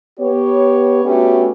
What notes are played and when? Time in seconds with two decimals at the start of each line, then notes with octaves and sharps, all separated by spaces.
0.19 B3 G4 C#5
1.05 A3 B3 C#4 D4 F#4 G4